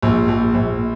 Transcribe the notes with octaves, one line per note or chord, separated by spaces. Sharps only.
A#1
A#1
A#1